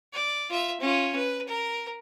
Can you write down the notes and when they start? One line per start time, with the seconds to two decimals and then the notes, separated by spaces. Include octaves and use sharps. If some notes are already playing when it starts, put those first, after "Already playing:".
0.13 D5
0.50 F4 E5
0.80 C#4 F4
1.15 B4
1.47 A#4